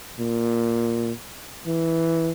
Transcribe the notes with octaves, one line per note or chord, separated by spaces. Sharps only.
A#2
E3